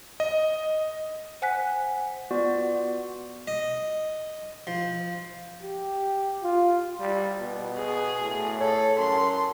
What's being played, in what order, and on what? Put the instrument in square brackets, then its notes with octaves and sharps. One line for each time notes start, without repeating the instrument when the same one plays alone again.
[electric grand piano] D#5
[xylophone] C5 F#5 G#5 F#6 B6
[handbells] B3 F4 F#4 D5
[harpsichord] D#5
F3
[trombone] G4
F4
[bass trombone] G3
B2
[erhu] G#4
[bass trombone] A2
[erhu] A4 [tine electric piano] C#5
[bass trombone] F#2 [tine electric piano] A5 [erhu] C6